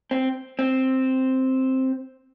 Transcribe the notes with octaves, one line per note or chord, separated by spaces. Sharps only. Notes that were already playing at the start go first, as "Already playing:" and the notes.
C4
C4